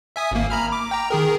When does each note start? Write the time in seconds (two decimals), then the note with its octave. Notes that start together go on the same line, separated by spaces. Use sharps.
0.16 E5 G#5 D#6
0.31 G#1 A#3
0.50 A#5 B5 F6
0.72 D6
0.91 G5 A#5
1.10 D#3 G#4 A#4